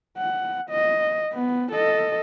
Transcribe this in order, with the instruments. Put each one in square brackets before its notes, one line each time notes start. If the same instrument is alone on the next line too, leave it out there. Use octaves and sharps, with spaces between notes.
[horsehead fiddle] F#5
D#5
B3
A4 D#5